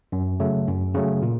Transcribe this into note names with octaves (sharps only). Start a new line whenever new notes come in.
F#2
C#3 F#3 A3
F#2
C#3 F#3 A3
A#2